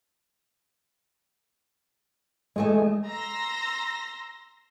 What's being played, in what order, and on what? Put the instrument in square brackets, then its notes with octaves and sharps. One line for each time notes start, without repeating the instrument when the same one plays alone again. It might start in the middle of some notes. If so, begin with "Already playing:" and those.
[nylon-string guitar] E3 A3 G#5 [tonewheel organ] G#3
[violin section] A#5 C6 E6 A#6